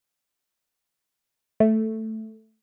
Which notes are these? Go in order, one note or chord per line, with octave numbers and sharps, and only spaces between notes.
A3